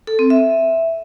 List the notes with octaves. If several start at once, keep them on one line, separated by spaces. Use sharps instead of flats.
A4
C4
E5